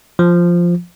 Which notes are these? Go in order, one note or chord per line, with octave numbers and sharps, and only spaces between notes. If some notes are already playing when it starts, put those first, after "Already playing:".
F3